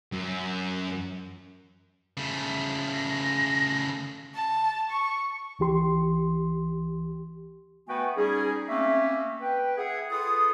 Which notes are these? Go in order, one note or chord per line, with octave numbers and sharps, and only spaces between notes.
F#2
C#3 A3
A#6
A5
C#6
C#2 E3 G4 C6
A3 B3 F#4 B4 G5 G#5
G3 C#4 D#4 G#4
A3 A#3 C4 C#4 E5
B4 G5
G#4 E5 F#5
F4 G#4 A4 B4 D#6